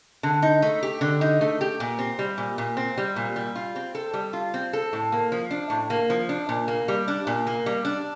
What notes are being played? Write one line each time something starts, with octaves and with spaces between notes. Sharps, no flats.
D3
D#4
A3
G4
D3
D#4
A3
G4
A#2
C4
G3
A#2
A#2
C4
G3
A#2
G3
F4
C4
A4
G3
F4
C4
A4
A2
A#3
F3
D4
A2
A#3
F3
D4
A#2
A#3
G3
D4
A#2
A#3
G3
D4